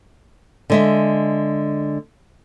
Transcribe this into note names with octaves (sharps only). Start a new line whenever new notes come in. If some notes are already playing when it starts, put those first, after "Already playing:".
D3 G#3 E5